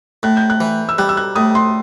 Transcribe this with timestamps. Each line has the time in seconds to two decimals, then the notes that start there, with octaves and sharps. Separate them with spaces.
0.23 A2 F#6
0.37 G6
0.50 F#6
0.60 E3
0.89 E6
0.98 G3 F#6
1.09 E6
1.17 F#6
1.35 A2 D#6
1.55 C6